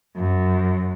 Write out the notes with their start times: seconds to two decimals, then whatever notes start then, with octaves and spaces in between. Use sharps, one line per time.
0.17 F#2